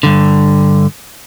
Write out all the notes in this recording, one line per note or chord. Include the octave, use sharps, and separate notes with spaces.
G2 D3